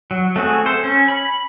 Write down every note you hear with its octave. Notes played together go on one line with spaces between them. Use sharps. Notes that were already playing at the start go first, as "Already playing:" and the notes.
F#3
A3 C4 F#4 G#4
A4 C5
C#4
B5